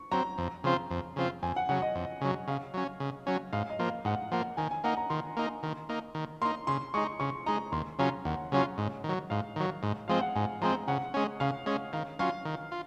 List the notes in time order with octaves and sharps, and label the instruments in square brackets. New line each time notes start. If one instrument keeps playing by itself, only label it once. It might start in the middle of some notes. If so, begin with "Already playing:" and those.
Already playing: [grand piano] C#6
[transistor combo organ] F#3 C4 [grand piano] A#5
[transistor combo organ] F2
C#3 F3 C4 F4
F2
C#3 F3 C4 F4
[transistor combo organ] F2 [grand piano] G#5
[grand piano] F#5
[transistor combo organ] C#3 F#3 [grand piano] F#5
[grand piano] D#5
[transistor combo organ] F2
C#3 F#3
[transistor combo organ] C#3 [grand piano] F5
[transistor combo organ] F#3 C#4
C#3
F#3 C#4
[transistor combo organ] G#2 [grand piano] F5
[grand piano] D#5
[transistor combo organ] F3 A#3
[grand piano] F5
[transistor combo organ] G#2 [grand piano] F#5
[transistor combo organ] F3 A#3 [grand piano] F#5
[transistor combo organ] D#3 [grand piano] G#5
[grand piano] G#5
[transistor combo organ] A#3 D#4 [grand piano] F#5
[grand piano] A#5
[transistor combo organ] D#3 [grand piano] C6
[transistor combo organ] A#3 D#4
D#3
A#3 D#4
D#3
[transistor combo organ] A#3 D#4 [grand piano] C6
[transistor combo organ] C#3 [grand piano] C6
[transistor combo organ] G#3 D#4 [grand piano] C#6
[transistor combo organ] C#3 [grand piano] C#6
[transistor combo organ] G#3 D#4 [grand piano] A#5
[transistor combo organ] D#2 [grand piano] C6
[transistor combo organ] C#3 F#3 C#4 F4 [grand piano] A#5
[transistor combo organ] D#2 [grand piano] F#5
[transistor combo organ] C#3 F#3 C#4 F4
G#2
D#3 F#3
[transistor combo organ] G#2 [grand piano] F5
[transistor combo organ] D#3 F#3
G#2
[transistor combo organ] F3 G#3 C4 [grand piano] F5
[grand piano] F#5
[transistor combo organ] G#2 [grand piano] G#5
[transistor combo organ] F3 G#3 C4 [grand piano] A#5
[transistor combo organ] C#3 [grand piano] F#5
[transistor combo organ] G#3 C#4
[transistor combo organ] C#3 [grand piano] F5
[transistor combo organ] G#3 C#4
[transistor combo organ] D#3 [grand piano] F5
[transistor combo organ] F#3 C#4 F4 [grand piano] F5
[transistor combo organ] D#3
F4